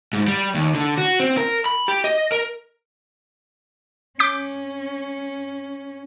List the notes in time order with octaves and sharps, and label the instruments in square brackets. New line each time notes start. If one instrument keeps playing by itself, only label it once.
[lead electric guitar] G#2
G3
D#2
D3
F#4
C4
A#4
B5
G4
D#5
A#4
[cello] C#4 [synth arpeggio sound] D6 G6 B6